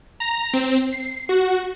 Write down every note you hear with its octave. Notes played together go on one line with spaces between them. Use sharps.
A#5
C4
C7
F#4